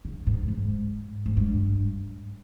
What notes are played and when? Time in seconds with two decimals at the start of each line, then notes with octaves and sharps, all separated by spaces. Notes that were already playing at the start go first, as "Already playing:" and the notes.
0.05 C#3
0.27 G#2
0.48 G#2
1.26 G#2
1.37 G2